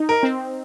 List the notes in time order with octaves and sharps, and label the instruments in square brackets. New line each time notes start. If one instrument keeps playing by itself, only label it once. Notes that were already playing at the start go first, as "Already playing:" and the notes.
Already playing: [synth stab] D#4
[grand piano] A#4
[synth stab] C4